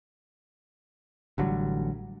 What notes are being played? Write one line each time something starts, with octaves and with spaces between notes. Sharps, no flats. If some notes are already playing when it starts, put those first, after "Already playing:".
A1 D3 F#3 G3